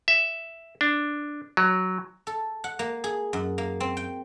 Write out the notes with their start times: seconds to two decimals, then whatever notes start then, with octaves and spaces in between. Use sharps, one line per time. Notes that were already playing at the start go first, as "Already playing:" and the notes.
0.08 E5
0.81 D4
1.57 F#3
2.27 A4
2.64 F#5
2.79 A#3
3.04 G#4
3.33 F#2
3.58 A#3
3.80 C4
3.97 G5